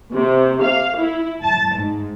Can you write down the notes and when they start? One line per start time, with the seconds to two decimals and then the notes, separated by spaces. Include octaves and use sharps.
0.14 C3
0.62 F5
0.97 E4
1.43 A5
1.76 G#2